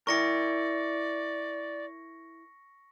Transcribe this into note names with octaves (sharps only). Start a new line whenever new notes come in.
E4 A#4 D5 C#6 A#6 C#7